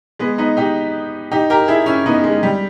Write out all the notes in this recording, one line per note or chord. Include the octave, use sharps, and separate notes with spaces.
G#3 B3
B3 D#4
D#4 G4
D#4 G4
G4 A#4
E4 G#4
C#4 E4
B3 D#4
G#3
G3